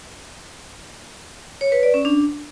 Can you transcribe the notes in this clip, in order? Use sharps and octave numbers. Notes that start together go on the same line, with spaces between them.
C#5
B4
D5
C#4
D4